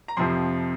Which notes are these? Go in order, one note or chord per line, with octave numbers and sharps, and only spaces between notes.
A#5
F2 C3 F3 C6